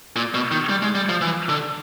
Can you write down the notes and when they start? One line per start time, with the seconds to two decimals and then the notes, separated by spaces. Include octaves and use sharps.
0.16 A#2
0.34 B2
0.51 D#3
0.69 G3
0.82 G#3
0.95 G3
1.09 F3
1.21 E3
1.49 D3